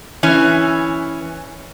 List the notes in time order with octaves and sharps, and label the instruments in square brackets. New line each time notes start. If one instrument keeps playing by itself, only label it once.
[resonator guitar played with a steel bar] E3 C#4